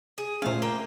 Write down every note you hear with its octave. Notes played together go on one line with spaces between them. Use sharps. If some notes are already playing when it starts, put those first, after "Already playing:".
G#4
A#2 A3 C#4 C5 F5
A#3 G5